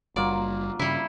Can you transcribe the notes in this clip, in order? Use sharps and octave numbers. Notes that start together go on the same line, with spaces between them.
F#1 F#3 G3 A#3 F4 D5
G2 C#3 G3 E4